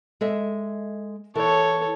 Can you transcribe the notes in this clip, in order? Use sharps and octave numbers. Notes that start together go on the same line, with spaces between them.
G#3 A4 E5
E3 A4 C#5